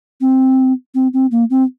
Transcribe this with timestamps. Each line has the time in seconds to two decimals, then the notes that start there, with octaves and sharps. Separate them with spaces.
0.21 C4
0.95 C4
1.14 C4
1.31 A#3
1.50 C4